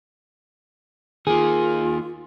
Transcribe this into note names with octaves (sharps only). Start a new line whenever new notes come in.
D#3 A#3 F4 G#4